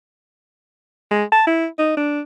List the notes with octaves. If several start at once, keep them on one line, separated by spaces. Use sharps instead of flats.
G#3
A5
E4
D#4
D4